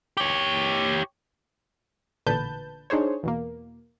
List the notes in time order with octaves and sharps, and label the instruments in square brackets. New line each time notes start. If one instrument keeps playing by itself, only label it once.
[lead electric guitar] G4 C#5
[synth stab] A1 A#2 D3 B4 A5 G6
D4 D#4 G#4 C5 C#5
E2 B2 A#3